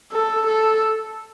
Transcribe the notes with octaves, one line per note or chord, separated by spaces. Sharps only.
A4
A4